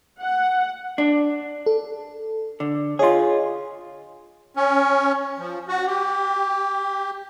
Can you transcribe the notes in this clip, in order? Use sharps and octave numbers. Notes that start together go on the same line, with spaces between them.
F#5
D4
A4
D3
F4 G#4 C#5 D#5 C6
C#4
F3
F#4
G4